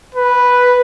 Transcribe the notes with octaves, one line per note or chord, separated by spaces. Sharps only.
B4